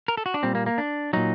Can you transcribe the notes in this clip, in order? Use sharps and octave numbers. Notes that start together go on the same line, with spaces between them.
A#4
A4
F#4
D4
A#2 G3 C4
A#3
A#3
D4
A#2 F#3 D#4